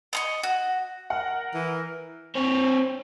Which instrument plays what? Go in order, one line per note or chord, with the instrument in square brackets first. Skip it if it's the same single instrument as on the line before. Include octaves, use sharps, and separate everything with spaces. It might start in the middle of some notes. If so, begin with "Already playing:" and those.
[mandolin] D#5 C6 C#6
F#4
[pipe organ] A#4 [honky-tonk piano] F#5
[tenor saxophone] E3
[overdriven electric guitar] C4 C#5